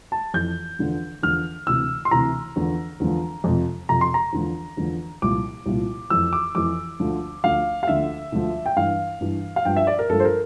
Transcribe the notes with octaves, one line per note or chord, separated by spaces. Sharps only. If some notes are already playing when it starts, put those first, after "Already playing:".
A5
F2 E3 G6
E2 D3 F3
E2 D3 F3 F6
D2 C3 E3 E6
C6
D2 C3 E3 A#5
E2 D3 F3
E2 D3 F3
F2 C3 F3
F2 C3 F3 A#5
C6
A#5
E2 D3 F3
E2 D3 F3
C2 A#2 F3 D6
C2 A#2 F3
F2 E3 E6
D6
F2 E3 D6
D2 D3 F3
D2 D3 F3 F5
F5
D2 D3 F3 E5
D2 D3 F3
G5
G2 E3 F5
G2 E3
F5
G2 F3 G5
E5
D5
A#4
G2 F3 A4
C5
A#4